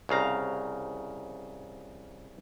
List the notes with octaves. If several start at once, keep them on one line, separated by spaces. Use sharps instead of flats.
C2 C#3 F5 A#5